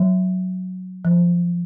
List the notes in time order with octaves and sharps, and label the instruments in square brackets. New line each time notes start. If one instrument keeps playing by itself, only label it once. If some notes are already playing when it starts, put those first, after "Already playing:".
Already playing: [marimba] F#3
F3